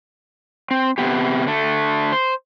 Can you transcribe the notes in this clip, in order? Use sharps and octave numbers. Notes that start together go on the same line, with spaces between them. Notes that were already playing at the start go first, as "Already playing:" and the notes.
C4
C3 E3 B3 G4
D3 A3
C5